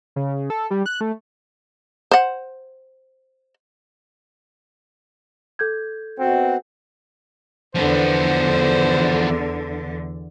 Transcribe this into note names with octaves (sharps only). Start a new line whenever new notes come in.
C#3
A4
G3
F#6
A3
C5 F#5
A4 G6 G#6
B2 C4 F#4 F#5
E2 D3 F3 B3 C5